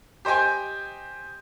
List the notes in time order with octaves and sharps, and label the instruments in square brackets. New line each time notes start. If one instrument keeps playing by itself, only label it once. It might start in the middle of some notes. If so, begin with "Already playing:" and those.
[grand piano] G4 C5 D#5 G5 G#5